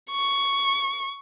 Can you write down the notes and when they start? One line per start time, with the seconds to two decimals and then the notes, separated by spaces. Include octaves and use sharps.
0.11 C#6